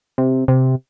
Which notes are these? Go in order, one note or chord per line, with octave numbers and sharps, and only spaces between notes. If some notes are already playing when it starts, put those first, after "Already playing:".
C3
C3